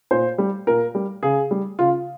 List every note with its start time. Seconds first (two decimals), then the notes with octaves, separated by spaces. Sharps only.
0.11 A#2 C5
0.38 G3
0.67 A#2 A#4
0.95 G3
1.23 C#3 G#4
1.51 G3
1.79 C#3 F4